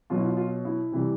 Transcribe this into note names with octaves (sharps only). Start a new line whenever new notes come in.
B2 F#3 F4
E4
F4
F4
E4
C3 E3 G3